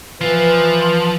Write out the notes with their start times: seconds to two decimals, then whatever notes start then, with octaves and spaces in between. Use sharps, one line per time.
0.21 E3 F3 B4